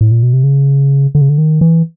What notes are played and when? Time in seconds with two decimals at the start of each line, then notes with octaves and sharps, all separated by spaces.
0.01 A2
0.11 A#2
0.23 B2
0.33 C3
0.43 C#3
1.15 D3
1.21 C#3
1.29 D3
1.38 D#3
1.61 E3